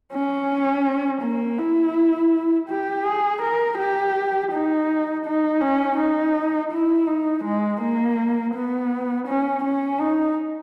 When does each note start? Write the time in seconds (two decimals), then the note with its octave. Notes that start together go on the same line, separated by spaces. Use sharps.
0.12 C#4
1.22 A#3
1.58 E4
2.69 G4
3.05 G#4
3.42 A#4
3.78 G4
4.52 D#4
5.25 D#4
5.61 C#4
5.98 D#4
6.72 E4
7.07 D#4
7.44 G#3
7.81 A#3
8.54 B3
9.27 C#4
9.64 C#4
10.00 D#4